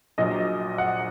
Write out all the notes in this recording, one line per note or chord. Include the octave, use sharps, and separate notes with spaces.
A#1 A#2 F#3 D#5
F#5